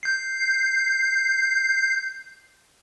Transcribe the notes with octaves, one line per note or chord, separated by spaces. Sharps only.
G6 C7